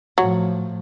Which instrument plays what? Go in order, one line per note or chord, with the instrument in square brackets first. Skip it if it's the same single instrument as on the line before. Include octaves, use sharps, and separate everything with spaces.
[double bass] A2 F3 [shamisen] F#3